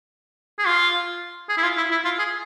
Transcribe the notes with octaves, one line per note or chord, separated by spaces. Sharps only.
G#4
F4
G#4
E4
F4
E4
E4
F4
G#4